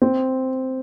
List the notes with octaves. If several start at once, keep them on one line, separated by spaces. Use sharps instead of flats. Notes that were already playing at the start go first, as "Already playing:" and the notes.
C4